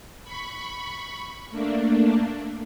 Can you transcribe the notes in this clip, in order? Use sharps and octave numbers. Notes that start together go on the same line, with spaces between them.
B5 C#6
A3 A#3 D4